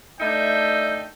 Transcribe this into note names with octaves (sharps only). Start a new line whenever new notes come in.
A3 D4 D#4 E5 G5